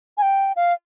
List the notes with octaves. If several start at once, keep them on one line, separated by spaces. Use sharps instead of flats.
G#5
G5
F5